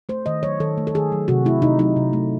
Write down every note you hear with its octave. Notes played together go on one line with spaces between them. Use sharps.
A3 C5
D#3 D#5
F#3 C#5
D#3 A4
A3
A4
D#3 G#4
F#3
C3 F#4
A3 E4
C3 D#4
F#3 D#4
C3
A3